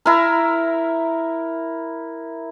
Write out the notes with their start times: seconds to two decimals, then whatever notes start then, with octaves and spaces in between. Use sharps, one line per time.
0.05 E4 A#4